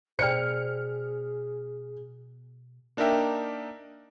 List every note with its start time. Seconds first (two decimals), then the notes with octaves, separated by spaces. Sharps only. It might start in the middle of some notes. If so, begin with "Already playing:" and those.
0.19 B2 G#4 C5 D5 G5 F6 C#7
2.97 A#3 D4 D#4 A#4 E5 G5